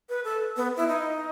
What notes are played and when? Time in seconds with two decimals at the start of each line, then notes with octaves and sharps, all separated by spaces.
0.09 B4
0.24 A4
0.57 B3
0.76 E4
0.88 D#4